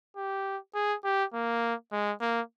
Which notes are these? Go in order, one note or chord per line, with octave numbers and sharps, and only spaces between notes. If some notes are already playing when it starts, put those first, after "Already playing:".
G4
G#4
G4
A#3
G#3
A#3